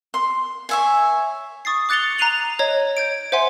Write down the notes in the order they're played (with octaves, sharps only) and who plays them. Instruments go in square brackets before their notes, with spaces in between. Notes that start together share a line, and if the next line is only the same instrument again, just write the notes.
[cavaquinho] C6
C#5 E5 G#5
[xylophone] C#6 D#6 A6 C7
D6 F#6 A6 C#7 F7 G7
A#5 F#6 C7 D#7 F7 F#7
C#5 D#5 A#5 G#6
G6 G#6 D7
C5 E5 F#5 G#5 C6